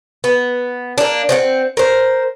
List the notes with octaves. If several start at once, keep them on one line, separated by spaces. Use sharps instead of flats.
B3
A#3 D4
C4 D4 F#5
A#4 C5